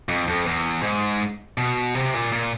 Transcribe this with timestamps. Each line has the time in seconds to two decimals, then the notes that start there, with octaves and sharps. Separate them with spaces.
0.09 F2
0.28 F2
0.46 E2
0.83 G#2
1.58 B2
1.95 C3
2.14 A#2
2.32 A#2